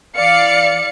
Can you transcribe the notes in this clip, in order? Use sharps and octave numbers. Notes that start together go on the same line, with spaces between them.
E3 D5 F5 C#7